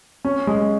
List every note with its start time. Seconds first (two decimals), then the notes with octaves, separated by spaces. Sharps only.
0.25 C#4
0.47 G#3